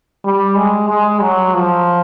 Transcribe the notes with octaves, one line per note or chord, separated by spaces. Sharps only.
G3
G#3
G#3
F#3
F3